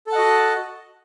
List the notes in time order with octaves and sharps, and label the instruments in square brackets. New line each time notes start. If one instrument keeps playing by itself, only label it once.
[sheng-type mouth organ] A4
A5
F#5
D#5
F#4